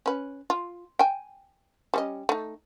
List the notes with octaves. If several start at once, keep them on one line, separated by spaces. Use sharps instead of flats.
C#4 B4
F4
G5 G#5
G3 C#4 D#5
A3 D#4